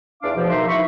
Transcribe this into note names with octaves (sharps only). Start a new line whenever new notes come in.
E2 D4 F5 D6
B2 F3
A#3 D#4 E5 C6
E4 B5 C#6